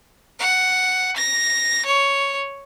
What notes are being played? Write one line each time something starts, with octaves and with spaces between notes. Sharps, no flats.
F#5
A#6
C#5